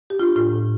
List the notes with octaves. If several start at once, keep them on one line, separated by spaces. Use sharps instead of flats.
G4
D4 F4
A2 F4
A2